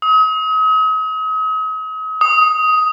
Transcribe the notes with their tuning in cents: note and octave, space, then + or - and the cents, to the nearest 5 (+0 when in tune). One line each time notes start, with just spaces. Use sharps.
D#6 +40
D#6 +10